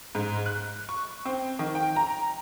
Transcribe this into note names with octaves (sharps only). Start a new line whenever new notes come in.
G#2
F#6
C#6
C4
D#3
G5
A#5